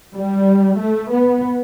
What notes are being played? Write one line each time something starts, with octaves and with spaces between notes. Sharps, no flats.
G3
A3
B3